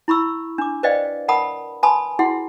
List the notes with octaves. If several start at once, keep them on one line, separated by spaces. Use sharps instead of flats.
E4 B5 C#6 E6
D4 D6
B4 C5 D5 D#5 F5 G5
A#4 F#5 A5 B5 D#6
B4 G#5 A5 B5 C6 D#6
E4 F#4 G#4 F#5 C6